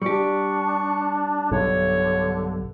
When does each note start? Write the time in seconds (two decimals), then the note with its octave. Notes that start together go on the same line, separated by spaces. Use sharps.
0.02 G3 D4 G4 C#6
1.52 B1 G2 D3 C#5